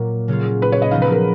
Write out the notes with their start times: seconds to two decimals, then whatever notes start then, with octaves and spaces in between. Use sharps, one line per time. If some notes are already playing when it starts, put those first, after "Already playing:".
Already playing: A#2 F#3 A#3
0.28 C#3 F#3 C#4 F4
0.62 B4
0.72 C#5
0.82 D#5
0.91 C#3 F3 B3 D#4 F5
1.02 B4
1.12 A#4